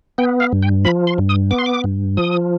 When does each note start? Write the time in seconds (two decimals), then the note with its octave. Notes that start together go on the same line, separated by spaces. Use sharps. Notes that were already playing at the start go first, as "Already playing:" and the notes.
0.18 B3 G5
0.40 F5
0.52 G2
0.63 G5
0.85 F3 B5
1.07 C6
1.18 G2
1.29 D#6
1.51 B3 D6
1.58 C6
1.66 D6
1.84 G2
2.17 F3 D#6